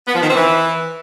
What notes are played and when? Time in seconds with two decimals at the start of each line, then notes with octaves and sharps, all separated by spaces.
0.07 B3
0.14 F3
0.21 D#3
0.29 C4
0.36 E3